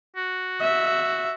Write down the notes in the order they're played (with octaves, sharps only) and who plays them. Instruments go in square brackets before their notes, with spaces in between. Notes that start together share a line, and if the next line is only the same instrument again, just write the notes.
[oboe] F#4
[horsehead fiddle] E5